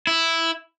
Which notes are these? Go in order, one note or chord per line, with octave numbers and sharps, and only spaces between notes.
E4